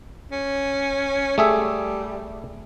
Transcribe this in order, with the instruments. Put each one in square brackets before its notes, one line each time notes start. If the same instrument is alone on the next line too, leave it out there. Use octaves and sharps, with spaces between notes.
[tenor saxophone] C#4
[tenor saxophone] G3 [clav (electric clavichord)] A3 G#4 E5